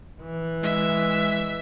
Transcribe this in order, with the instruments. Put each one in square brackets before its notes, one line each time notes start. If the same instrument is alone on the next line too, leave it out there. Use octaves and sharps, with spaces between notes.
[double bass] E3
[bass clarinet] G#3 [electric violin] E5